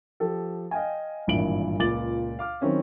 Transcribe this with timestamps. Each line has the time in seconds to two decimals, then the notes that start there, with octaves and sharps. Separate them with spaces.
0.20 F3 G4 A4
0.71 D#5 F5 G5 G#5
1.27 G#1 G2 A#2 E3 D7 F#7
1.79 C#2 A#2 D6 A6 F#7
2.39 F5 D6 F6
2.61 D#3 F#3 C4 C#4 E4